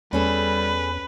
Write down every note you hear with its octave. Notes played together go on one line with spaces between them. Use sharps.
E2 G3 C#4 G#4 A4 B4